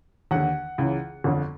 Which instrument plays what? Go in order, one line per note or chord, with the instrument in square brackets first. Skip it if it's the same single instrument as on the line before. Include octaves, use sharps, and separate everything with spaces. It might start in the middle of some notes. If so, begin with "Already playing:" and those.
[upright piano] D#2 D3 F#5
C#2 C#3 E3
G1 F2 D3